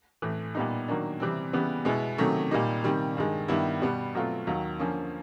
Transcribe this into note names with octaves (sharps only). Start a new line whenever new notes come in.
A2 E3 A3
A#2 G3 B3 D#4
D#3 F#3 A#3 D4
C3 E3 G3 C4
C#3 E3 G3 B3
B2 G#3 B3 E4
C3 D#3 F#3 A3 C#4
A#2 G3 A#3 D#4
C3 D#3 G3
G2 D#3 G#3
G2 D#3 G3 B3 E4
B2 G3 B3
B2 F#3 A3 C4 F4
D#2 D#3 F#3
D3 F3 A#3 C#4